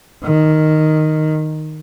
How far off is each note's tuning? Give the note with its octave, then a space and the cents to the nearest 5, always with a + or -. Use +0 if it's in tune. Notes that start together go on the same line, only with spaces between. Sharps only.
D#3 -5